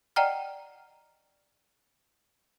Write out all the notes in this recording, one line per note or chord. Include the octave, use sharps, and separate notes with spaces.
D5 D#5 F#5 G5 A#5 F6